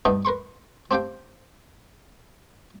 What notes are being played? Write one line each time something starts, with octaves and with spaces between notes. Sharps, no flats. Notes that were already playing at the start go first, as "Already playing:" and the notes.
G2 B2 B3 D4 D#4
A#4 B4 C6 C#6
C4 D4 G4 F5 G5